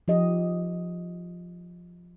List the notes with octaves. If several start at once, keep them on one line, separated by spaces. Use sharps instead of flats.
F3 G4 D#5